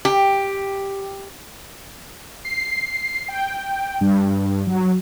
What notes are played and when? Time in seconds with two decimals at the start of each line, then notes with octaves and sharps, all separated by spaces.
0.05 G4
2.45 C7
3.28 G5
4.01 G2
4.67 F#3